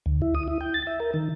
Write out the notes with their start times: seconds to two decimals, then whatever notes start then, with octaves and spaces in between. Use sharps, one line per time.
0.06 D2
0.22 E4
0.35 D#6
0.48 E4
0.61 G5
0.74 A6
0.87 E5
1.00 A#4
1.14 D#3